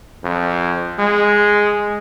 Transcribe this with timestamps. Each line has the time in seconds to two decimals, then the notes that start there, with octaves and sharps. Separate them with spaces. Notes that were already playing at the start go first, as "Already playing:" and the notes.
0.24 F2
0.99 G#3